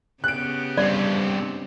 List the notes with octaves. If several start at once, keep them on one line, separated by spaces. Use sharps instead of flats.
C#3 B3 G4 F#6 D7
G2 C4 D5